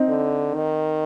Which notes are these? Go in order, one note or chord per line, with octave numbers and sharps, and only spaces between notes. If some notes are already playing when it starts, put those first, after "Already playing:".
Already playing: C4 D#4
D3
D#3